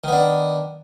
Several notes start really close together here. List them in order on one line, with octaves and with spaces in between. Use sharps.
D#3 B3 D4